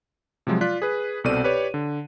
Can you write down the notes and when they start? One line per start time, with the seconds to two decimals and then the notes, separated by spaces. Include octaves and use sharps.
0.47 C3 F3 F#3 G#3
0.61 F4 D5 F#6 B6
0.82 G#4 B4
1.24 C2 B2 C4 A4 D5 D#7
1.44 G4 B4 C#5 D5
1.74 D3